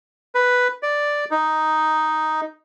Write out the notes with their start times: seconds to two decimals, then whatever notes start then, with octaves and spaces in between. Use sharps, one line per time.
0.35 B4
0.83 D5
1.31 D#4